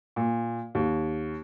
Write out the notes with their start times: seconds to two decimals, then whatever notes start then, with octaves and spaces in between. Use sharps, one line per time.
0.16 A#2
0.75 D#2